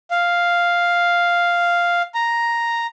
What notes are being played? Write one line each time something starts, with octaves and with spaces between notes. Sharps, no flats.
F5
A#5